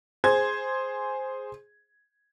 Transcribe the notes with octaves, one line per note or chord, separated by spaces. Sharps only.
G#4 C5 G#6